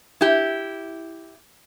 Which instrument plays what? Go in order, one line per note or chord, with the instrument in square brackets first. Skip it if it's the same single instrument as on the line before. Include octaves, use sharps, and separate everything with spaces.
[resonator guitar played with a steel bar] E4 G4